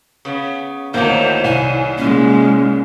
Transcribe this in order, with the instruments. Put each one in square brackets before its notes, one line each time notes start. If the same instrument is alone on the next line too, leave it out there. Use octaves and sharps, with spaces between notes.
[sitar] C#3 B3
[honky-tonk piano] D2 A#3 G6 [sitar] A2 D#3 [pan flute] C5
[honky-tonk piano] C2 [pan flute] G#5
[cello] A#2 G#3 [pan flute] C#4